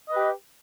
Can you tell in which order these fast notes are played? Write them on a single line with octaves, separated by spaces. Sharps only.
D#5 B4 G4